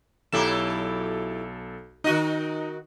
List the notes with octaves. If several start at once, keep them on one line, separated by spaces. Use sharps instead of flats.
B1 F#3 E4 G4 A4 E7
D#3 D#4 F#4 D#5